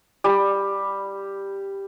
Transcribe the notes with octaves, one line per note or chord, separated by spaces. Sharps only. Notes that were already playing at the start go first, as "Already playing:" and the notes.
G3 G4